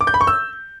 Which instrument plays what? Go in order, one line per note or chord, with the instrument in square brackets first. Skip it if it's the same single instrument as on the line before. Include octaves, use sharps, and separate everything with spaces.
[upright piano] D6
G6
B5
C#6
E6